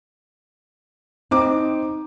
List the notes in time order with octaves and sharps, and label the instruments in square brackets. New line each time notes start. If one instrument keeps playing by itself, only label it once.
[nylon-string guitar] C4 [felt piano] D#4 D6